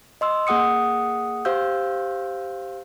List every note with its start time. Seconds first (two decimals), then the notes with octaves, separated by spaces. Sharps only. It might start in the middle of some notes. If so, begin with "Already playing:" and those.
0.21 D#5 C6 E6
0.47 A#3 G#4 F#5 D#6 C#7
1.45 G4 C5 F5 E6 G6